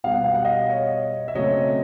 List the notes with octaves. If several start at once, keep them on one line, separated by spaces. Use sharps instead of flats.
B2 G3 B3 F5
F#5
F5
F#5
D#5 F5
C#5 D#5
E5
C#3 F#3 A3 C4 C#5 D#5